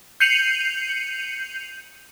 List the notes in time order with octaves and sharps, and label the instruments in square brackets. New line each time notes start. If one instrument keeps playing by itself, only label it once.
[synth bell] G6 C7 C#7 D#7 F7 F#7